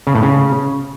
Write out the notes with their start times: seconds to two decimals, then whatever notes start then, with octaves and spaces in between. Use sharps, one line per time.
0.07 C#3
0.15 A2
0.23 C#3